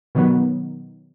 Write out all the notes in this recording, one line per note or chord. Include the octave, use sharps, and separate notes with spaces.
B2 D#3 F#3 B3